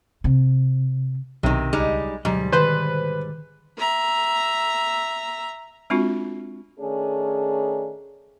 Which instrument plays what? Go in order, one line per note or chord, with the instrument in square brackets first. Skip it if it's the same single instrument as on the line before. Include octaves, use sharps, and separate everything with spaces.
[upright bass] C3
[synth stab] B1 [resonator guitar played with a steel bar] C3 D#3
[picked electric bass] C#2 [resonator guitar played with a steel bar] G3 G#3 D#4
[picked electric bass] D2 B2 F#3 [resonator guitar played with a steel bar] G#2 G3
[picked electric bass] B2 D3 D#3 [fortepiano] B4 [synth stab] C5
[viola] E5 A#5
[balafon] G#3 C4 D4 F4 F#4
[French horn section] D#3 A3 C#4 D4 G#4